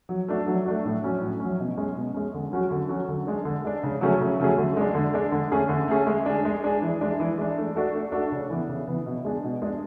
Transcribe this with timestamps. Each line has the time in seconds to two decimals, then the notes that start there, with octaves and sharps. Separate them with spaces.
0.09 F#3
0.28 A3 D4 F#4
0.47 F#3
0.66 A3 D4 F#4
0.85 A2
1.03 F#3 C#4
1.21 A2
1.40 F#3 C#4
1.60 B2
1.77 G#3 C#4
1.96 B2
2.14 G#3 C#4
2.34 D3
2.52 F#3 C#4 F#4
2.71 D3
2.89 F#3 C#4 F#4
3.09 D3
3.27 G#3 D4
3.45 D3
3.64 G#3 D4
3.83 C#3
4.01 F#3 A3 C#4 G#4
4.20 C#3
4.40 F#3 A3 C#4 G#4
4.58 D3
4.77 G#3 D4
4.95 D3
5.14 G#3 D4
5.32 D3
5.51 A3 C#4 G#4
5.69 D3
5.88 A3 C#4 G#4
6.07 G#3
6.26 D4 G#4
6.45 G#3
6.64 D4 G#4
6.82 E3
7.01 G#3 D4
7.20 E3
7.38 G#3 D4
7.57 A3
7.76 D4 F#4 A4
7.94 A3
8.12 D4 F#4 A4
8.32 C#3
8.50 E3 B3
8.69 C#3
8.87 E3 B3
9.06 B2
9.24 G#3 D4 G#4
9.44 B2
9.62 G#3 D4 G#4